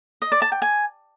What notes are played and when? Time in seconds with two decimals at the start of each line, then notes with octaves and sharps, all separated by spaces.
0.22 D#5
0.32 D5
0.42 A5
0.52 G5
0.62 G#5